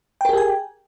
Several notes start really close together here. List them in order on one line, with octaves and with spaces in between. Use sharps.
G5 A#4 G#4 G4 G#5